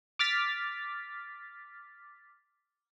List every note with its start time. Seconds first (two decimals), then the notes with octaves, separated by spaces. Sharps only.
0.19 D6 F6 A6 B6